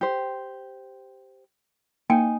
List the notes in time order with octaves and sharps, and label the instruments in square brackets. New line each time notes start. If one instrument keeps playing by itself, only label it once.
[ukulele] G4 C5
[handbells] A#3 G5 C#7 [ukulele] D#4 G#5